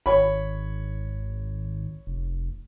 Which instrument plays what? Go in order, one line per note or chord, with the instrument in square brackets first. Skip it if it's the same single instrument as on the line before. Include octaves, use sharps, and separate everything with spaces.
[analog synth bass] G#1 [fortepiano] C#5 B5
[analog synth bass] F1